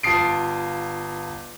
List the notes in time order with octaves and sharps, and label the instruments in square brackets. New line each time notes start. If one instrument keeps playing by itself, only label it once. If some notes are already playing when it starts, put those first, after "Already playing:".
[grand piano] G1 F4 A5 D#6 C7 D7